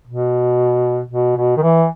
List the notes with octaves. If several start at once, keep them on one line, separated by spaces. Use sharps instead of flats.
B2
B2
B2
D#3
E3